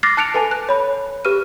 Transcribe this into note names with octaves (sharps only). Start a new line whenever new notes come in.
D6 F6 F#6 A6 A#6 C7
A5 F#6 C#7 D7 F7
A4 B4 G#5 A5
F#6
C#5 B5
G4 B4 F6 D#7